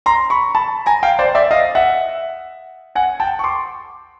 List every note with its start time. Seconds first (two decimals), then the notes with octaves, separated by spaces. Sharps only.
0.06 A#5 C6
0.30 B5 C#6
0.55 A5 B5
0.86 G#5 A#5
1.03 F5 G5
1.19 C5 D5
1.35 D5 E5
1.51 D#5 F5
1.75 E5 F#5
2.95 F#5 G#5
3.20 G5 A5
3.39 C#6
3.44 C6 D6